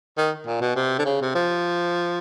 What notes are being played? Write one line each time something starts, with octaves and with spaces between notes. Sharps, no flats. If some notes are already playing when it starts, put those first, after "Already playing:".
D#3
A#2
B2
C3
D3
C#3
C3
F3